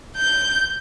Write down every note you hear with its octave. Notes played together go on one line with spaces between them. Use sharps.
G6